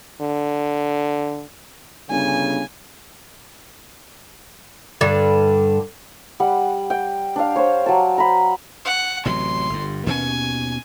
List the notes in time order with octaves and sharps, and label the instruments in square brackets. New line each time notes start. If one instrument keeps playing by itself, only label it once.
[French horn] D3
[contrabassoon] G1 [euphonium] C#3 [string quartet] G#5
[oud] G2 D3
[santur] G3 F#5
G5
D4 F5
C5 C#5
F#3 D5 A5
A#5 B5
[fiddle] F#5
[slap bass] A1 C3 F#3 [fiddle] C6
[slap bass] G1 G2
[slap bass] D#2 B2 C#4 [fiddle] G#5